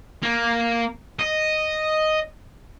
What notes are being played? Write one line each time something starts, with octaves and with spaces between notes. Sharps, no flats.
A#3
D#5